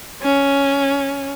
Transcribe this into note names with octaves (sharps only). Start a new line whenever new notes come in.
C#4